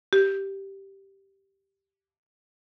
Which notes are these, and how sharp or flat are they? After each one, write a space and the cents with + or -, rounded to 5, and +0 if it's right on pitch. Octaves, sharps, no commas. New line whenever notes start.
G4 -5